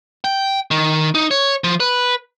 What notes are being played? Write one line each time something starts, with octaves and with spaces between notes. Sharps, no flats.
G5
D#3
D#4
C#5
F3
B4